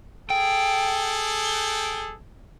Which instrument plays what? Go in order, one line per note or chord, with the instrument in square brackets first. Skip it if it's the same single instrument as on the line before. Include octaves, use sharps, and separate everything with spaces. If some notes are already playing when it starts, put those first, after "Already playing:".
[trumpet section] G#4 A4 [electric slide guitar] G5